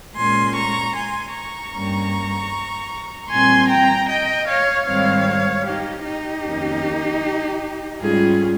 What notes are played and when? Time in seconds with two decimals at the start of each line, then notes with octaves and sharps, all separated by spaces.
0.16 A#2 G#3 C#4 G#5 C6
0.55 A#5 C#6
0.95 G#5 C6
1.35 A#5 C#6
1.74 G2 G3 A#3 C#4
3.30 A#2 G3 C4 G#5 C6
3.70 G5 A#5
4.09 D#5 G5
4.48 C#5 F5
4.87 G#2 D#3 G3 C4 C#5 F5
5.66 D#4 G4
6.05 D#4 G4
6.44 F2 D#3 A#3 C#4
8.01 G#2 G3 C#4 F4 G#4